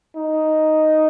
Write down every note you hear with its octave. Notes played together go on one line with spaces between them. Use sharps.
D#4